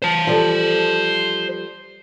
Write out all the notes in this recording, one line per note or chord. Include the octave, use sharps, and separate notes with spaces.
C5 A5
F3 G3 A4